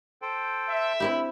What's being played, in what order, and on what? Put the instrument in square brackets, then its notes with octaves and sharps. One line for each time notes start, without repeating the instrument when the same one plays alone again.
[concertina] A4 C5 G5
[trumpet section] E5
[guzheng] C4 E4 G4 [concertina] B5